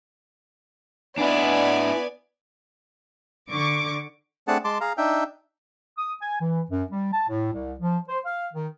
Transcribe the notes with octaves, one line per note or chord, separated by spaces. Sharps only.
B3 D4 E4 D5 G#5
D3 C#6 D6
A3 C4 D4 G#4 F#5 A5
G#3 A5 C6 D6
G#4 F5 A#5
D4 D#4 E5 G5
D#6
G#5
E3
F#2
G3
A5
A2
C2
F3
C5
F5
D#3